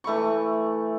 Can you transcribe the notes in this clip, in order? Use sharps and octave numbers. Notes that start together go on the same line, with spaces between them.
E3 A3 B5 C#6